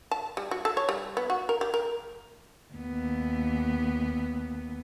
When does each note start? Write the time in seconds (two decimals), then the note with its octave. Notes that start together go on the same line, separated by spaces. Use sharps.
0.11 A5
0.37 G3
0.51 F#4
0.65 A4
0.77 C#5
0.89 G3
1.17 B3
1.30 F#4
1.49 A#4
1.61 G4
1.74 A#4
2.73 D#2 B3